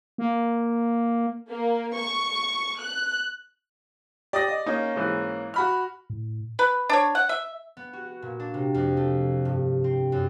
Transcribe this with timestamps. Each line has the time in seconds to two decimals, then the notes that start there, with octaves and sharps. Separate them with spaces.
0.18 A#3
1.50 A#3
1.95 C#6
2.81 F#6
4.33 G4 D5 D#6 A#6
4.48 D#5
4.66 A#3 C#4 D#4
4.95 G#2 E3
5.54 F#4 B5 F6
6.10 A2
6.59 B4
6.89 D4 C#5
7.15 F#5
7.29 E5
7.77 B3
7.93 F#4
8.22 A#2
8.40 D4
8.54 C3
8.74 F2
8.97 A3
9.45 G2
9.84 C4
10.12 F#2